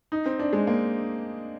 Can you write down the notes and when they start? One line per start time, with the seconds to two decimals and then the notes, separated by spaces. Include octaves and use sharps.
0.12 D#4
0.26 C4
0.39 D4
0.53 G#3
0.67 A#3